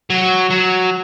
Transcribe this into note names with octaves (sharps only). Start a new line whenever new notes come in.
F#3
F#3